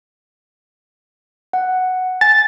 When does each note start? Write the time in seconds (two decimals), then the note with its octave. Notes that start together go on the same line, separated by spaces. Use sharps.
1.53 F#5
2.21 G#5 A6